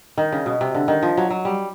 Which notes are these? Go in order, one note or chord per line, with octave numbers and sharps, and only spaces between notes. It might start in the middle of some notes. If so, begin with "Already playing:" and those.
D#3
C#3
B2
C3
D3
D#3
F3
F#3
F#3
G3